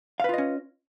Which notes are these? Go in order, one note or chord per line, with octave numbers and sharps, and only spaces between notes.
C#4 F4 B4 D#5 F5